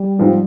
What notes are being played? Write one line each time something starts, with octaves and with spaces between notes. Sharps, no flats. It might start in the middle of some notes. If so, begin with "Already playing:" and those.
Already playing: G3
G#2 F3 C4